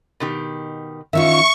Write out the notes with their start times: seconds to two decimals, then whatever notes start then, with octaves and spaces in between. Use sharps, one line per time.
0.20 B2 D#3 G4
1.13 D#3 C#4 F4 E5 C#6